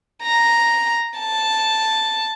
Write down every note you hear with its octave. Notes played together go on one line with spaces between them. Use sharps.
A#5
A5